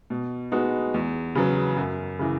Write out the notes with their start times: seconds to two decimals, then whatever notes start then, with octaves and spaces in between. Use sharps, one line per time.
0.10 B2
0.52 G#3 B3 D#4 F#4
0.94 E2
1.35 C#3 F#3 B3
1.77 F#2
2.19 C#3 E3